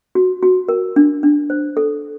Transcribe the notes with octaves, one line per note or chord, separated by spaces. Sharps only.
F#4
F#4
A#4
D4
D4
C5
A4